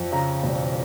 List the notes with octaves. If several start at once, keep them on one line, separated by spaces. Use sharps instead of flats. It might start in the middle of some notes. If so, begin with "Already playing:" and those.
Already playing: F2
C#3 A#5
E1